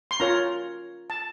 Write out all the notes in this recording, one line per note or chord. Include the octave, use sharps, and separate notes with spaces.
C6
C#4 F4 A#4 C#5 A#5
A5